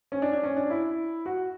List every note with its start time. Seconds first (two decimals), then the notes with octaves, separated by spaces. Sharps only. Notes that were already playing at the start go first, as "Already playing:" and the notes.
0.12 C#4
0.22 D4
0.33 D4
0.43 C#4
0.57 D4
0.70 E4
1.26 F#4